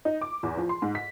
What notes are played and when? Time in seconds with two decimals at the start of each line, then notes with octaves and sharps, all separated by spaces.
0.05 D#4
0.21 D6
0.43 E2
0.57 F3
0.69 C6
0.82 G#2
0.95 B6